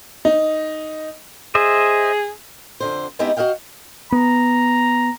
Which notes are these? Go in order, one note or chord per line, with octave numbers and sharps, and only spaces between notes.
D#4
G#4 C5 D#5 E5
F2 D3 C5
G#3 B3 C4 D#4 E4 G4
F#4 A4 D#5 F5 G5
B3 A#5